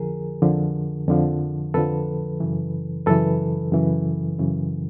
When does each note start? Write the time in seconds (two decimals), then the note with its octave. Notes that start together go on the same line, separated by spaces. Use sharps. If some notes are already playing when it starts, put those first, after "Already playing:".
Already playing: F2 D3 F3 G#4 A#4
0.42 F2 D3 F3
1.08 F2 D3 F3
1.74 F2 D3 F3 A4 B4
2.40 F#2 C#3 E3
3.06 F#2 C#3 E3 A4 B4
3.72 F#2 C#3 E3
4.39 F#2 C#3 E3